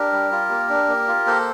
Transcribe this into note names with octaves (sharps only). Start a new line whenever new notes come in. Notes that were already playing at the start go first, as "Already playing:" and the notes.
Already playing: D4 G4 A#4
G3
F4
A#3
D4
A#3
F4
A#3 A4 C5